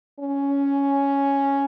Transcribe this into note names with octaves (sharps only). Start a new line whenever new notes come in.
C#4